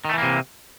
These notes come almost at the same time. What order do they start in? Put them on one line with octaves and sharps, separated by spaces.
D#3 A3 E3 A#3 C3